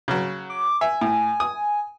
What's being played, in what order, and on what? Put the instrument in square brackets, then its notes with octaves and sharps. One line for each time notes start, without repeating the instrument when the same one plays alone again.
[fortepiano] C#3 F#3
[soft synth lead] D6
[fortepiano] E5 [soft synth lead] G#5
[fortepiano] A2
D#6